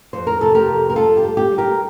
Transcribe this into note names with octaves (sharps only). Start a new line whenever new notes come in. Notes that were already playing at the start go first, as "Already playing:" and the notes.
F2 C5
A#4
C3 A4
G4 A#4
F2
A#4
G3 F4 A4
G4
G3
G4
G3
G4 A#4